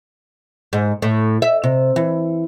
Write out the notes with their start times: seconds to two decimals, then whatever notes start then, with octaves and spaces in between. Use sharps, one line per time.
0.73 G#2
1.02 A2
1.42 E5
1.64 C3
1.96 E3